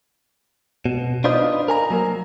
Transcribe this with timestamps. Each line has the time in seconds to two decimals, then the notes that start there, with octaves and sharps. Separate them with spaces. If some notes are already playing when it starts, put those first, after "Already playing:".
0.86 B2
1.24 D4 D#4 F4 B4 C5 D#5
1.68 A#4 G#5 A#5
1.90 F#3 A#3 A#4